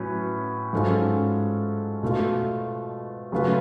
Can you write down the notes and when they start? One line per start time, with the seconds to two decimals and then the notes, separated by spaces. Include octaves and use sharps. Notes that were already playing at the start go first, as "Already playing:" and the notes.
Already playing: A2 F#3 C#4 B4
0.73 G#2 F#3 C#4 F4 A4
2.03 B2 A3 F4
3.32 C#3 F#3 A3 F4 B4